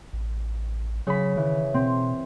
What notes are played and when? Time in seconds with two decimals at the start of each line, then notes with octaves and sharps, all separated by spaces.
0.13 A1
1.07 C#3 F#3 B5
1.37 D#3 E3
1.74 B2 C4